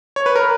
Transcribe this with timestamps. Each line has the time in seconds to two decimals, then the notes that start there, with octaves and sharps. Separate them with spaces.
0.16 C#5
0.26 B4
0.35 A#4